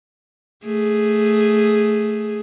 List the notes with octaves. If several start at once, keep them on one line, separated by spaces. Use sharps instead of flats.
A3 G#4